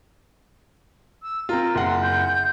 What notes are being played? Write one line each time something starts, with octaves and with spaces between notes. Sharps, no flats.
E6
C4 F4 A#4
F#1 F#5 C6
G6